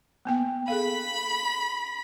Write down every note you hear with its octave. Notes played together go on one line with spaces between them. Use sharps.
A#3 B3 G5
G#4 A4 F5 B5 B6